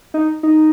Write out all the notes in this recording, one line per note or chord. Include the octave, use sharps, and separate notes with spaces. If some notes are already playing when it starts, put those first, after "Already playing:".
D#4
D#4